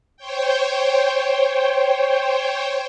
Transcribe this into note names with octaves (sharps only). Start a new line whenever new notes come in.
C5 C#5 G5